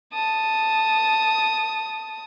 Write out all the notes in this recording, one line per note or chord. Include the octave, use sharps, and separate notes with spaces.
A5 D#6